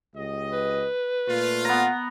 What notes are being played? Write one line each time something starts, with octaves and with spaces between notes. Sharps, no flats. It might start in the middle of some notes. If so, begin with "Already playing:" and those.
C#2 G4 D#5
B4
A#2 A3 F4
B3 A#5